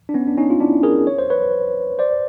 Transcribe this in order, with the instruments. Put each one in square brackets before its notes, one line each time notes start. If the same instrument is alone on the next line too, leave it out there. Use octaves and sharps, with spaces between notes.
[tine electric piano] D4
B3 C#4
D4
C#4 D#4
F4
D4 E4
G#4 A#4
C#5
C5
B4 C#5
C5 D5